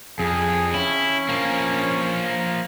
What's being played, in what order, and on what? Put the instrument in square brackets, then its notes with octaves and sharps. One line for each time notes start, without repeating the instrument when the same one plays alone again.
[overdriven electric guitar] F2 [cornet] G#4
[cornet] C#4 [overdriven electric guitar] E4
[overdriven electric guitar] F3 A#3